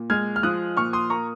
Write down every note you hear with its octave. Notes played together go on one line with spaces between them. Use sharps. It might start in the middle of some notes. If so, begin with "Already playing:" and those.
Already playing: A#2
G#3 F6 G#6
F6
F3 D#6 F#6
A#2 C#6 F6
C6 D#6
A#3 A#5 C#6